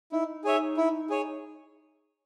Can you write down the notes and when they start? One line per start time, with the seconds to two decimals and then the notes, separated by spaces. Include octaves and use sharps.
0.12 D#4 E4
0.44 G#4 C#5 E5
0.77 E4
1.10 G#4 C#5